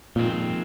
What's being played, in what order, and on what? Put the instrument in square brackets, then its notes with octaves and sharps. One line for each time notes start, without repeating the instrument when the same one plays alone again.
[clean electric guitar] F2 D#3 G#3 C4 [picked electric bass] A#2